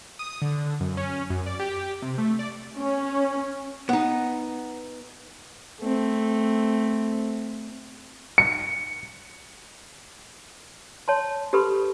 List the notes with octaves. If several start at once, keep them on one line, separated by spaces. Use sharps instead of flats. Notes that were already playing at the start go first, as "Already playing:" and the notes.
D#6
D3
F#2
C#4
F#2
D5
G4
C3
A3
D5
C#4
B3 D#4
A3 C4
C#7
C#5 A5 C6
G4 A4 B4 B5 C6